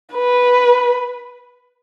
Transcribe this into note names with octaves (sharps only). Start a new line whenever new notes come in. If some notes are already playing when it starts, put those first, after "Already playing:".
B4